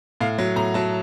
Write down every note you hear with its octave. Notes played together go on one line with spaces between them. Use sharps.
A2 F5
F#3
A2 A#5
F#3 A5